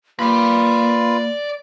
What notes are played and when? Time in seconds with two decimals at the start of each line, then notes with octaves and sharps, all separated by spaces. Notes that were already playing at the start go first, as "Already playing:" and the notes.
0.19 A#3 F4 B4 D5 B5